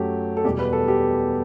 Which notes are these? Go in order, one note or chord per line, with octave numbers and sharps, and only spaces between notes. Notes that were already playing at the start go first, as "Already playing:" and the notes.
Already playing: F#2 F#3 A3 G4
A4
E2 B2 G3 G4
B4
A4
G4